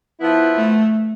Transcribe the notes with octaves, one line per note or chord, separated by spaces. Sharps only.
F3 B3 E4
A3